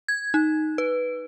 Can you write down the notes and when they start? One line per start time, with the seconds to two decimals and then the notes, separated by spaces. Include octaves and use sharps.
0.08 G#6
0.34 D#4
0.78 B4